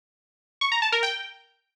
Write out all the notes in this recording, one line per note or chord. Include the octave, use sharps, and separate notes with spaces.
C#6
A#5
A5
A#4
G5